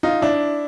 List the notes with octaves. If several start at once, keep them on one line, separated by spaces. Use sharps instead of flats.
D#4 F4
D4 E4